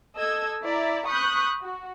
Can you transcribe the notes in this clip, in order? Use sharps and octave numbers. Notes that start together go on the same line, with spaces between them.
A4 D#5 E6 G#6
E4 D5 E5 A#5
B5 C#6 D#6 F#6 G6
F#4